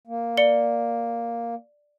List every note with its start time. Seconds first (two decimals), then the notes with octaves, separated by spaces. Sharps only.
0.07 A#3
0.37 D5 C#7 G7